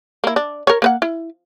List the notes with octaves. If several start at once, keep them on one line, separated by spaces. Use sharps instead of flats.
A#3 E4
D4
A#4 C#5
A#3 B4 F#5
E4